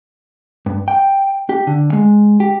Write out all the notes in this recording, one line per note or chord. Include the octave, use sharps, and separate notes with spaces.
G2
G5
G4
D3
G#3
G4